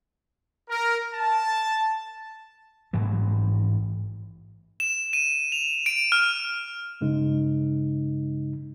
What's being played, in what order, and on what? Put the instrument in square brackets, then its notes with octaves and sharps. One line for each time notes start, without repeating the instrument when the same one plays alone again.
[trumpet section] A#4
A5
[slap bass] A1 G#2 E3 F#3
[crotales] E7
D#7
F7
D7
F6
[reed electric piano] G2 C#3 G#3 D#4